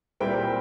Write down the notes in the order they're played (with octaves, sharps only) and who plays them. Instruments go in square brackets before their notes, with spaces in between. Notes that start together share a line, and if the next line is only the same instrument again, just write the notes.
[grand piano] A#2 G3 C4 E4 G5